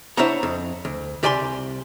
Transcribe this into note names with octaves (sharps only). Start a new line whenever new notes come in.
D4 E4 C5 C#5 F#5 A#5
F2
D2
C2 G4 D5 G#5 B5 C6